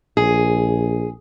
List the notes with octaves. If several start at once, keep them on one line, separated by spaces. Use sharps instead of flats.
A#1 G#4